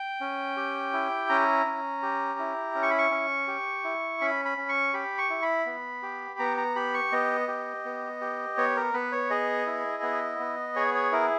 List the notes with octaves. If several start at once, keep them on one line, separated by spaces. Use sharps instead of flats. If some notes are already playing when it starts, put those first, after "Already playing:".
Already playing: G5
C#4
G4
E4
C#4 A#5
C#4
G4
E4
C#4
C#6
B5
C#6
C#4
G4
E4
C#4 B5
B5
C#4
C#6
G4 B5
C#6
E4
B5
B3
G4
B3 A#5
A#5
G4 B5
C#6
B3 D#5
G4
B3
G4
B3 C#5
A#4
B3 B4
C#5
G#4 D#5
E4
B3
B3
G#4 C#5
C#5
E4 A#4